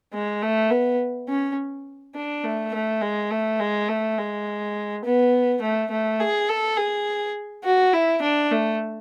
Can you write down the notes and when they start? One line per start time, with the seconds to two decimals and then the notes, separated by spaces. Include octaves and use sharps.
0.13 G#3
0.42 A3
0.71 B3
1.28 C#4
2.15 D4
2.44 A3
2.74 A3
3.02 G#3
3.31 A3
3.60 G#3
3.89 A3
4.18 G#3
5.05 B3
5.62 A3
5.91 A3
6.20 G#4
6.49 A4
6.77 G#4
7.64 F#4
7.93 E4
8.22 D4
8.51 A3